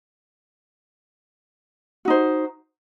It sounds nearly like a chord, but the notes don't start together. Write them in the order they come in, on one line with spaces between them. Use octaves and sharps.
F#4 D#4 C5